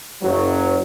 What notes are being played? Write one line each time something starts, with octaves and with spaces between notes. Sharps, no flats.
F#1 F#3